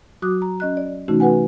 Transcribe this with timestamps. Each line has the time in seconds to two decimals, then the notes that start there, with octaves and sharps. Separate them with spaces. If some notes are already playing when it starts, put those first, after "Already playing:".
0.22 F#3 F#4 D6 D#6 F#6
0.42 A#5
0.60 C#4 D#5 F#6
0.77 D5
1.08 C3 E3 A3 C#4 D#4 F#4
1.20 F#4 B4 F#5 G#5